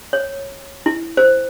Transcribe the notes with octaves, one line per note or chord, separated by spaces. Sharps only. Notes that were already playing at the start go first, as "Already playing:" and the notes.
C#5
E4
C5